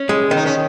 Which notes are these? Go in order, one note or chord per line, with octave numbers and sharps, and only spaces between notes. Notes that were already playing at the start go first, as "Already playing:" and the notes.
Already playing: C#4
G#3
D#3
D#4
C#4